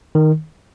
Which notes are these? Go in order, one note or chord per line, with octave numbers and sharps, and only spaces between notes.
D#3